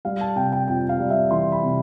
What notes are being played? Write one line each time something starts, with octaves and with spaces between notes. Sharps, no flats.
G3 F5
A5
C3 G5
G5
F2 G5
F5
G3
E5
E3 C6
B5
C3